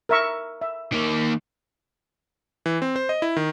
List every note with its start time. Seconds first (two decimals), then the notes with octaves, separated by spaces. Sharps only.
0.09 A#4 E5 C#6
0.61 E5
0.93 D#3 A#3
2.66 E3
2.82 C4
2.96 C5
3.09 D#5
3.22 E4
3.37 D#3